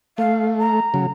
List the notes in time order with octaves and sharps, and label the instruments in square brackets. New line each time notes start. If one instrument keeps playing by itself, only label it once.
[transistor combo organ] A3 [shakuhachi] F5
[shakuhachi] A#5
[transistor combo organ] C#3 F#3